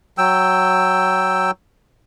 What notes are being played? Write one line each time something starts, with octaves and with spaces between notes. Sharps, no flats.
F#3 G5 E6